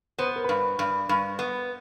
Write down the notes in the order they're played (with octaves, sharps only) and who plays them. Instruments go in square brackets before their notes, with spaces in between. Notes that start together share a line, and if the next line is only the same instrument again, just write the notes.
[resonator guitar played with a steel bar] B3 [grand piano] C5
[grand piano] B4
A#4
[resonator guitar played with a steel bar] G2 [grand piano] B4
[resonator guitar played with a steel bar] G2
G2
B3